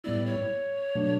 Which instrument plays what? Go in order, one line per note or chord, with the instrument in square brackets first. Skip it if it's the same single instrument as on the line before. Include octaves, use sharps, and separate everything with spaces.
[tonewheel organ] A2 G3 B3 E4 [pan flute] D5
[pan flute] C#5
[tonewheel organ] B2 F#3 A3 D4